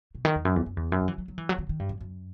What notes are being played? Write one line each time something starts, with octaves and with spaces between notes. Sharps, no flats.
B2
D#3
E2
F#2
E2
F#2
E2
F#2
F#3
E3
F#3
F#3
E3
F#3
D#3
D#3
G2
F#2
F#2